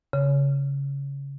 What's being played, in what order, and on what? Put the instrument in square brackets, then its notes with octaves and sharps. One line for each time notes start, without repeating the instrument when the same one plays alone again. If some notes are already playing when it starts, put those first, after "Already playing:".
[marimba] C#3